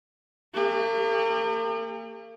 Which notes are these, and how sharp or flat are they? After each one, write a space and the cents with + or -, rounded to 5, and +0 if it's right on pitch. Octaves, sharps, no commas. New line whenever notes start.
A#3 -40 G4 +45